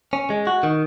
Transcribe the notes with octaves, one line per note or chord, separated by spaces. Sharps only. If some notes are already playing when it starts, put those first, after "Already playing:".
C#4
G#3
F#4
D#3